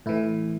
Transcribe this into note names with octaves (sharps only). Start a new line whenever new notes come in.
A2 E3 E4